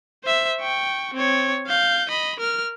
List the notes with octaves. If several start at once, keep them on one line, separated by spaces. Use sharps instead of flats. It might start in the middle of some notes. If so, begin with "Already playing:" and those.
C5 E5
G5 C#6
C4 C#5
F5 G6
D#5 B5
A#4 F6